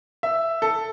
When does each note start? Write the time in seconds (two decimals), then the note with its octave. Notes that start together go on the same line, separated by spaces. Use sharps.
0.23 E5
0.62 A4